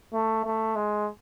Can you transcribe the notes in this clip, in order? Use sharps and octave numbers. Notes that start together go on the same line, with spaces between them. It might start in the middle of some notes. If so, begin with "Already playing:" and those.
A3
A3
G#3